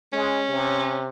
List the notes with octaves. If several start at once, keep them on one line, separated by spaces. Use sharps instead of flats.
G#3 C#4
C3